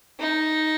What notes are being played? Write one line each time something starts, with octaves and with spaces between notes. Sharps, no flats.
D#4